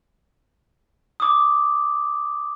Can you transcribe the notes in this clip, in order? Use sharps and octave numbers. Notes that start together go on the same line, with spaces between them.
D6 D#6